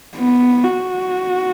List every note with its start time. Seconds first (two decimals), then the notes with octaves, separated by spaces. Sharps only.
0.16 B3
0.64 F#4